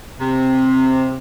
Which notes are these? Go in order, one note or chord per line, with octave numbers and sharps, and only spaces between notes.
C3